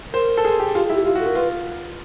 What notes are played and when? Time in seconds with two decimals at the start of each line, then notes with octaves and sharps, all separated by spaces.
0.13 A#4 C5
0.37 A4
0.45 G#4
0.60 G4
0.75 F4 G4
0.85 G#4
0.90 E4
0.95 G4
1.05 F4 G4
1.15 F#4
1.20 A4
1.26 F#4 A#4
1.35 F4 B4